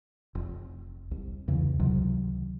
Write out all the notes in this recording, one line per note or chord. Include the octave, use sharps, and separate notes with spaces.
F1
C2
E2 C#3 E3
C#2 C3 D#3 F#3